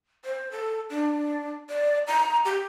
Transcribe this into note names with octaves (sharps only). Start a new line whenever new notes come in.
C5
A4
D4
D5
A#5
G4